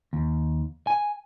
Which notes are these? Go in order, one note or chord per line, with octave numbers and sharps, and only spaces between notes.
D#2
G#5